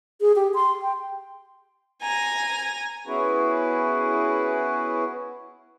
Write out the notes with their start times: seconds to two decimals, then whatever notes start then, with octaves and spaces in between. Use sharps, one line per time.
0.21 G#4
0.36 G4
0.54 C6
0.82 G5
2.02 G#5 A#5
3.07 B3 C#4 E4 F#4 G#4 B4